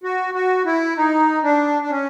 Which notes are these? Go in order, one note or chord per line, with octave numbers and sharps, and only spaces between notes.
F#4
F#4
E4
D#4
D4
D4
C#4